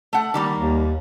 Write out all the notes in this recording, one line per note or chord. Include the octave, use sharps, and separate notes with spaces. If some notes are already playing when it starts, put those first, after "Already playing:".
A3 F#5
D#3 G3 A#3
D#2